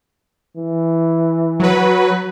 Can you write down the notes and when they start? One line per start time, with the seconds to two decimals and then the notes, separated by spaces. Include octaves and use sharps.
0.56 E3
1.60 F#3 B4